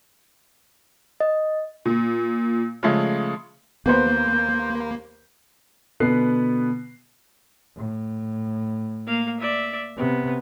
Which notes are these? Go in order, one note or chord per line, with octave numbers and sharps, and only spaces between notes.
D#5
A#2
C#3 F3 G#3 A3
D#2 A#3 B3 B4 C5 G6
B2 D3 B3 B4 F#6 C7
A2
A#3 F5
D5 E5
C3 B3